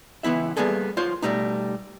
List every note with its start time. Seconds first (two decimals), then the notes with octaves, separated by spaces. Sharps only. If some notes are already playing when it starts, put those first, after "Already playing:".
0.23 C#2 E3 B3 E4 E5
0.57 G3 A#3 B3 G#4 A4
0.97 F4 C5 C#5
1.22 B2 E3 G3 A3 D#4